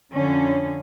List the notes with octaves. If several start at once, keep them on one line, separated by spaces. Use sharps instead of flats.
F2 D3 C#4